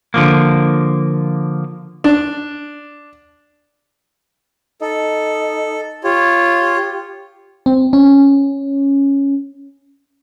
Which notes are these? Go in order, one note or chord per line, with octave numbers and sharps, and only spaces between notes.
D3 F3 A#3
D4
D#4 A4
F4 G4 C#5
C4
C#4